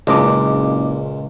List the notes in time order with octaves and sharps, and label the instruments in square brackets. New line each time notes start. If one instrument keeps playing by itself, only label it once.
[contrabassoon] F#1 [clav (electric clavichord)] C#2 [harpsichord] A#2 G#3 [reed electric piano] D4 D#5 D6